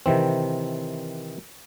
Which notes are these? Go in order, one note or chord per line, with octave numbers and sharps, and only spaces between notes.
C3 D#3 E3 C4